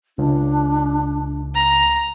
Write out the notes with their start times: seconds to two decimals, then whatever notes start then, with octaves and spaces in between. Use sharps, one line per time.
0.18 C#2 D4
1.54 A#5